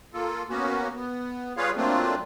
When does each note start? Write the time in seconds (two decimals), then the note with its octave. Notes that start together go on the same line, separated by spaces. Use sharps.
0.14 A#3 F4 A4
0.49 A#3 B3 C#4 F#4
0.95 B3
1.57 G3 F4 G#4 B4 C#5 F5
1.77 F#3 A3 A#3 C4 D4 F4